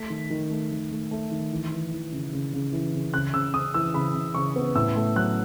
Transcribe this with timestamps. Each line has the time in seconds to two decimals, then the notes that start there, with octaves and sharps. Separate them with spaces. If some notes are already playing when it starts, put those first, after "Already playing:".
Already playing: A3 B6
0.10 D#3
0.30 D#3
0.51 A3
0.71 D#3
0.91 A3
1.11 A3
1.31 D#3
1.51 E3
1.72 E3
1.92 E3
2.12 C#3
2.33 C#3
2.53 C#3
2.73 E3
2.93 C#3
3.14 C#3 F#6
3.33 C#3 E6
3.54 C#3 D#6
3.74 E3 E6
3.94 C#3 B5
4.14 C#3
4.34 C#3 C#6
4.56 B3
4.75 A2 E6
4.95 A3
5.16 F#3 F#6